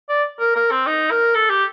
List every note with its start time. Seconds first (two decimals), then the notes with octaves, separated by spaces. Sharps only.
0.09 D5
0.40 A#4
0.56 A#4
0.71 C4
0.87 D#4
1.11 A#4
1.35 A4
1.50 G4